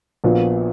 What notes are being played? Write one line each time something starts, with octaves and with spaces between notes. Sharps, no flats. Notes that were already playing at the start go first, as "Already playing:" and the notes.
A#1 A#2 F3 B3 F#4